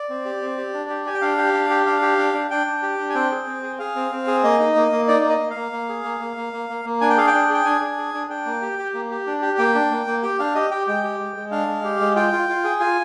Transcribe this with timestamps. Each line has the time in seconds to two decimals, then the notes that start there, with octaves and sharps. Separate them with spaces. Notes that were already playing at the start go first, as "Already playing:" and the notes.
Already playing: D5
0.09 C4
0.25 G4
0.41 C4
0.57 G4
0.74 D4
0.90 G4
1.06 G4 G#5
1.14 G5
1.22 D4 F5
1.38 G4
1.54 D4
1.70 G4
1.86 D4 F5
2.02 G4
2.18 D4
2.34 D4
2.51 D4 G5
2.67 D4
2.83 G4
2.99 D4
3.09 G#5
3.14 C4 G5
3.31 G#4
3.47 C4
3.63 G#4
3.79 G#4 F5
3.96 C4
4.11 C4
4.27 G#4
4.44 A#3 D#5
4.59 D#4
4.76 A#3
4.92 A#3
5.08 D#4 D5
5.24 A#3
5.29 D#5
5.40 A#3
5.50 F5
5.56 A#3
5.72 A#3
5.89 G#4
6.04 A#3
6.20 A#3
6.37 A#3
6.53 A#3
6.69 A#3
6.85 A#3
7.01 D4 G#5
7.10 G5
7.17 G#4 F5
7.27 G5
7.34 D4
7.50 G#4 G5
7.65 D4 G#5
7.81 D4
7.97 G#4
8.14 D4
8.29 D4 G5
8.46 A#3
8.62 G4
8.79 G4
8.94 A#3
9.11 G4
9.27 D4
9.42 G4
9.58 A#3 G5
9.75 D4
9.91 A#3
10.07 A#3
10.23 G4 G5
10.39 D4 F5
10.55 G4 D#5
10.71 G4 G5
10.87 G#3 G5
11.04 G4
11.20 G#3
11.36 G#3
11.51 D4 F5
11.67 G#3
11.84 G4
12.00 G#3
12.15 F4 G5
12.33 F4
12.49 F4
12.64 G#4
12.80 F4 G#5